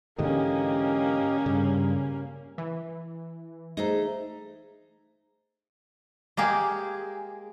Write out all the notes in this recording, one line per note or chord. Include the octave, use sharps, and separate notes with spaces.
G#2 D3 E3 A#3 C#4 G4 D#5
G2 C#3
E3
A3 D#4 G#4 C5 A#5
G#3 A#3 G4 G#4